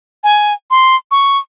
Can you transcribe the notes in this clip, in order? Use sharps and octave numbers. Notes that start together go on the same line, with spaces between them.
G#5
C6
C#6